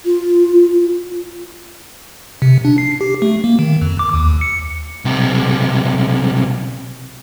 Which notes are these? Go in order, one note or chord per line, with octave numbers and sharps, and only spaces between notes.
F4
C3
D4
C7
G4
A3
A#3
D#3
F2
D6
D#2
C#7
B1 C3